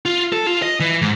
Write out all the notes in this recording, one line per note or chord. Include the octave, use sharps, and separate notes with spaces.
F4
A4
F4
D#5
E3
G#2